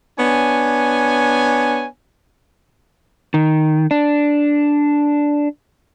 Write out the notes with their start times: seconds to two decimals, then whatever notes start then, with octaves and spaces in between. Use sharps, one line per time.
0.19 B3 D4 C#5 G#5
3.34 D#3
3.91 D4